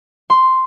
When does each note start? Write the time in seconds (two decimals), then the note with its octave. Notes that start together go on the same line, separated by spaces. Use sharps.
0.30 C6